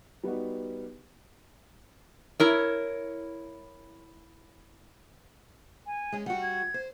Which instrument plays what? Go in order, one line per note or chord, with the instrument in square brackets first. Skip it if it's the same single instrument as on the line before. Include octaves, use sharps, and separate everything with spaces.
[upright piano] G3 B3 D#4 F#4
[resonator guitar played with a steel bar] E4 A#4 C#5
[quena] G#5
[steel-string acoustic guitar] G#3 C#4 G#4
[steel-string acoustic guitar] G3 F#4 [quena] F#5
[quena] G#6
[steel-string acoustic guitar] C5